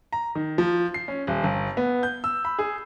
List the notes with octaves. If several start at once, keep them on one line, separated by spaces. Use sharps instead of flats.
A#5
D#3
F3
C7
C#4
D#1
G1
B3
G6
E6
B5
G#4